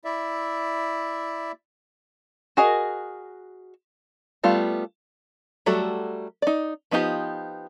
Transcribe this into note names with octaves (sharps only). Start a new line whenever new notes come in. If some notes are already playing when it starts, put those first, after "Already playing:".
E4 D5 E5
F#4 G#4 A#4 D#5
G3 A3 B3 F4
F#3 G3 A3 F#4 A4
D#4 D5
F3 B3 D#4 F4 G4